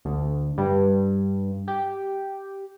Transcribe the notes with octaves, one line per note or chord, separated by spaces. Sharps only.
D2
G2
G4